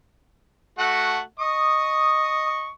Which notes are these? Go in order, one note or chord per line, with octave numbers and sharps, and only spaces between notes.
A3 F#4 F#5
D#5 C#6 D#6